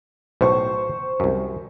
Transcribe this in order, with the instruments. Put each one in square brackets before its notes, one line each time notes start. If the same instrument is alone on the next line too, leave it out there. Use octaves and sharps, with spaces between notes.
[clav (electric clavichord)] B1 A2 [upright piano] C5 C#6
[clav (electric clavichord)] C2 F#2